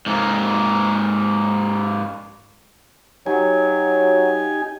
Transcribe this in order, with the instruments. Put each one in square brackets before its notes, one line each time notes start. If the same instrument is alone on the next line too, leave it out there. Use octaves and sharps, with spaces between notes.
[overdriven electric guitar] G#2 A#3
[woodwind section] F#3 [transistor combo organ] D#4 G4 G#5